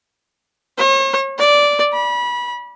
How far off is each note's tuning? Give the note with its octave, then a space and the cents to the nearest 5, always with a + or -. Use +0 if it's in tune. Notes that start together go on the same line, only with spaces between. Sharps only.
C#5 -45
D5 -10
B5 -25